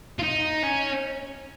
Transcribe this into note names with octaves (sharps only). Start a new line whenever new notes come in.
F4
D#4
C#4